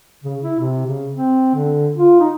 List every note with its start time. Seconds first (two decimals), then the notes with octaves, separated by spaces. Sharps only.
0.24 C#3
0.43 E4
0.60 C3
0.86 C#3
1.14 C4
1.55 D3
1.96 F4
2.20 D#4